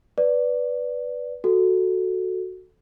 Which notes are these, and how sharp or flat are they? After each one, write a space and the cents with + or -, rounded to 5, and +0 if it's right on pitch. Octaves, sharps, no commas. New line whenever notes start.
B4 +0 D5 -5
F#4 +0 A4 +0